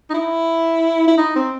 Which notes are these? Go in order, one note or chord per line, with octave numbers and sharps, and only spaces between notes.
D#4
E4
E4
D#4
C4